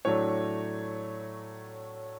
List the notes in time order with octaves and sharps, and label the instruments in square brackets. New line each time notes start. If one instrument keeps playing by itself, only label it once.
[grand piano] A2 F#3 A3 D4 C#5